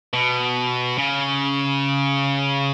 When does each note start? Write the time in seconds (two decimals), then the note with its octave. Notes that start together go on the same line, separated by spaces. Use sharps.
0.14 B2
0.98 C#3